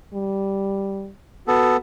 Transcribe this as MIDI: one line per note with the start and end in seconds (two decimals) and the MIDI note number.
0.14 1.10 55
1.48 1.77 59
1.48 1.76 66
1.48 1.77 69